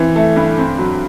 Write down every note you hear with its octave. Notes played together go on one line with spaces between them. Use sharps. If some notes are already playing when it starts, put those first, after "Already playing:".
Already playing: E3 C4
A3
G2
C4
F#3